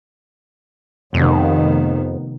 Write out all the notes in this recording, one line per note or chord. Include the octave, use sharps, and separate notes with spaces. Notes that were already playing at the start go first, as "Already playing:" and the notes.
F1 F2 D#3 B3